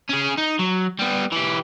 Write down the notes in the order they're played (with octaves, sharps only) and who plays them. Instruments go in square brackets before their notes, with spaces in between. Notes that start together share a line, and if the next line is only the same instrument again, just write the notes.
[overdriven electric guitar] C#4 G#4
D#4
F#3
G3 B3
E3 G4